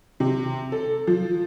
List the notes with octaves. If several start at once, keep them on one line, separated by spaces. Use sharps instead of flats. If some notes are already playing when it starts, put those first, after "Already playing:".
C3
A4
F3